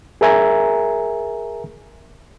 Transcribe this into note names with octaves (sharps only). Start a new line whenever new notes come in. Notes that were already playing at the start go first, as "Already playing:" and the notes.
G#4 A#4 E5 G#5 A#5